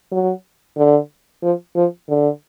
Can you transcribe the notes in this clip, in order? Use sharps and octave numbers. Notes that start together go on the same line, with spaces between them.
F#3
D3
F3
F3
D3